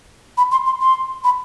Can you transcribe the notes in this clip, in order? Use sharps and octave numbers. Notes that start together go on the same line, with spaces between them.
B5
C6
C6
C6
B5